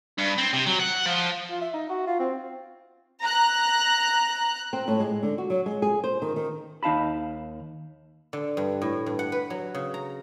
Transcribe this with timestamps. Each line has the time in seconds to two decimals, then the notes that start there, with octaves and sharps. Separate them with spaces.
0.18 G2
0.38 C4
0.53 C3
0.66 F#3
0.80 F#5
1.06 F3
1.50 F4
1.61 E5
1.73 D#4
1.89 F#4
2.07 F4
2.19 C4
3.23 A#5 F#6
4.73 C4
4.88 A2
5.00 G#3
5.23 D3
5.38 F#4
5.50 F#3
5.66 G#3
5.82 G#4
6.04 C5
6.22 D#3
6.36 D#3
6.83 D#2 D#4 F5 A5 B5
8.33 D3
8.57 G2
8.82 A2
9.06 G2
9.19 F#5
9.32 B4
9.50 F#3
9.74 C#3
9.94 A#5